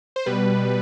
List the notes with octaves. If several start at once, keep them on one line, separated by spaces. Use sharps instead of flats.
C5
B2 G3 B4